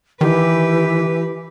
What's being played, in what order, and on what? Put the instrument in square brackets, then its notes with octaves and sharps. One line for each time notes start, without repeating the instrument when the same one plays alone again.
[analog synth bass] D#3 [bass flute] E3 [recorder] G4 [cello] B4